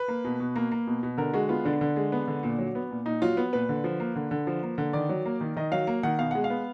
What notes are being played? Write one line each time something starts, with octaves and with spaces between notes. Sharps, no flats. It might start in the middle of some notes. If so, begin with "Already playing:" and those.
Already playing: B4
A#3
B2
B2
A#3
A#3
B2
B2
D3 A#4
G#3 F#4
B3 F4
D3 D4
D3
G#3
B3
D3
A#2
F#3
B3
A#2
A#2 D#4
F#3 F4
B3
A#2 B4
D3
F3
A#3
D3
D3
F3
A#3
D3
D#3 D5
F#3
A#3
D#3
D#3 D#5
F#3 F5
A#3
D#3 F#5
B2 F5
G#3 F#5
F5
B3